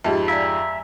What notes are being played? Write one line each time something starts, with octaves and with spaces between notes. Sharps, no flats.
F2 G#2 G4 D#5 E5 A5
D5 E5 F5 G#5 A#5